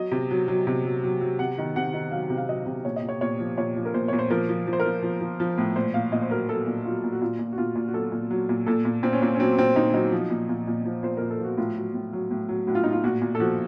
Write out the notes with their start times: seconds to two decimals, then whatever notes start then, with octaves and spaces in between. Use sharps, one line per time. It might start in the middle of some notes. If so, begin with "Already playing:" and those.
Already playing: F#3 D#5
0.12 C3
0.31 F#3
0.48 F#3
0.67 C3
0.84 F#3
1.03 F#3
1.21 F#3
1.39 C3 F#5
1.58 D#3
1.76 C3 F#5
1.94 D#3
2.12 F#3 F5
2.30 C3
2.37 F5
2.48 F#3 D#5
2.66 C3
2.85 A#2 C#5
2.96 D#5
3.03 A#2
3.09 C#5
3.21 A#2 C#5
3.40 F3
3.57 A#2 C#5
3.76 F3
3.85 A#4
3.94 A#2 C5
4.08 A#2 C#5
4.19 C5
4.30 F3 A#4
4.49 F3
4.67 F3
4.73 C5
4.80 A#4
4.85 F3
5.03 F3
5.21 F3
5.40 F3
5.58 A2
5.76 A#2 C5
5.94 A#2 F5
6.12 A#2 D#5
6.22 C5
6.30 F#3 A#4
6.49 F#3 A4
6.67 A#2
6.85 F#3 F4
7.03 A#2
7.12 F#4
7.21 A#2 F4
7.39 A#2
7.52 F#4
7.58 A#2 F4
7.75 A#2
7.88 F#4
7.94 F#3 A4
8.12 A#2
8.31 F#3
8.49 A#2
8.66 A#2 A4
8.85 A#2
9.03 A#2 C4
9.13 C#4
9.22 A#2 C4
9.35 C#4
9.39 F#3 C4
9.58 A#2 C4
9.75 A#2 D#4
9.94 F#3 D#4
10.12 F3
10.30 A#2
10.49 A#2
10.67 A#2
10.86 F3
11.03 A#2 C5
11.17 A#2 A#4
11.30 A4
11.39 F3 F#4
11.57 A2 F4
11.76 F#3
11.94 A2
12.13 F#3
12.31 A2
12.49 F#3
12.67 A2 F#4
12.75 F4
12.84 A2 D#4
12.93 F4
13.04 A#2 F#4
13.22 A#2
13.35 A4
13.40 F3 F#4